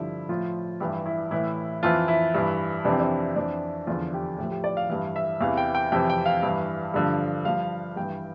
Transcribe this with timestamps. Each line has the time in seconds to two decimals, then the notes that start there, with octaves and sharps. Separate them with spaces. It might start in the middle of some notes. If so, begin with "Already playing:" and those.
Already playing: G2 D3 F3 E4
0.29 A2 F3 F4
0.80 G2 E3 G4
1.06 E4
1.31 A2 E3 E4
1.83 F2 E3 F4
2.08 E4
2.34 G2 E3
2.85 F2 C3 E3 D4
2.92 C4
3.00 D4
3.36 F2 E3 D4
3.87 E2 D3 F3 F4
4.13 G4
4.38 A2 G4
4.43 F3
4.51 G4
4.64 D5
4.77 F5
4.90 G2 E3 F5
5.16 E5
5.41 E2 C3 E3 F5
5.57 G5
5.75 G5
5.92 F2 C3 E3 G5
6.10 G5
6.26 F5
6.42 G2 E3
6.94 G2 D3 F3
7.45 G2 F3 F5
7.96 G2 E3 G5